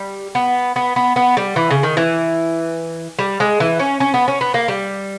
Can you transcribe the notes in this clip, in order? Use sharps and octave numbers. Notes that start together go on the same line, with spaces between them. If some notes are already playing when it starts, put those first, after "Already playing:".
Already playing: G3
B3
B3
B3
B3
G3
E3
C#3
D#3
E3
G3
G#3
E3
C#4
C#4
B3
C#4
B3
A#3
G3